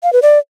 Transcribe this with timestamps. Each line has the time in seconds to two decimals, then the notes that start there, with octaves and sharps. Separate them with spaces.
0.03 F5
0.13 B4
0.22 D5